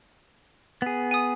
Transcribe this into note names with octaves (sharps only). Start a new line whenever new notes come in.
B3 G#4
G#5 D#6